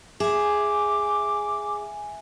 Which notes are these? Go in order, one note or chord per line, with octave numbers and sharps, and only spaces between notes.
G#4 E5 G#5 D6